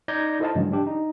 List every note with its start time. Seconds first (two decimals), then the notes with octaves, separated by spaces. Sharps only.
0.08 D#4 D5 G6 G#6 A#6
0.40 E4 A4 C5 D#5 F5 A5
0.55 G2 C#3 E3 F#3 G#3
0.72 D4 G4 D5
0.87 D#4